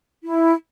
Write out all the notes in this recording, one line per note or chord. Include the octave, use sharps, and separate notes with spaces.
E4